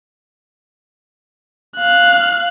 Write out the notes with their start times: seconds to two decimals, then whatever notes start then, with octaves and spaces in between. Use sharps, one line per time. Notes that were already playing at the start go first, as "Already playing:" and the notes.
1.78 F5 F#6